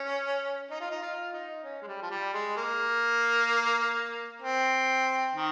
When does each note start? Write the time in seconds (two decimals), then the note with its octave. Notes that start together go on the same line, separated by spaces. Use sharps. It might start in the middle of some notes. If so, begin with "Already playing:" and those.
Already playing: C#4
0.71 D#4
0.81 F4
0.91 D#4
1.02 F4
1.33 D#4
1.64 C#4
1.82 G#3
1.88 G3
2.02 F3
2.11 G3
2.34 G#3
2.57 A#3
4.42 C4
5.35 D#3